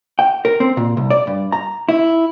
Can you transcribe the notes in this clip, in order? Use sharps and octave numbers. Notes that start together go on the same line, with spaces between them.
G5
A#4
C4
A#2
C2
D5
G2
A#5
E4